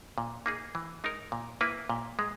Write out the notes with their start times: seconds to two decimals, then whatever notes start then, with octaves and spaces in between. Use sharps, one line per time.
0.18 A#2
0.46 A#3 D#4 G#4
0.75 E3
1.04 G#3 D#4 A#4
1.32 A#2
1.61 A#3 E4 B4
1.90 A#2
2.19 G#3